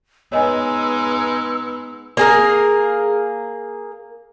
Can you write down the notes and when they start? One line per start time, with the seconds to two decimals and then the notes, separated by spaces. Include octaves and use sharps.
0.32 G#3 B3 D#4 C#5 D#5 G#5 E6
2.17 A#3 G#4 A#4